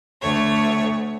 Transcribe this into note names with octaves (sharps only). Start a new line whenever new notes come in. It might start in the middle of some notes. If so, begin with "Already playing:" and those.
D2 A3 C#5